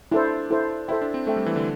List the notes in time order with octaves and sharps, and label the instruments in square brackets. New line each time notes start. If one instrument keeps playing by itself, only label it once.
[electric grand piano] D4 [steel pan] E4 A4 C5
[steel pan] E4 A4 C5
[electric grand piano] E4 [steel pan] A4 C5 E5 G5
[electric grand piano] D4
C4
[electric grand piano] A3 [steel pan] A4 C5 E5 G5
[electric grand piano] G3
E3
D3